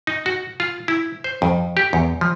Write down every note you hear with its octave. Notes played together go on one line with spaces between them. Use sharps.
D#4
F#4
F4
E4
C5
F2
G4
E2
F3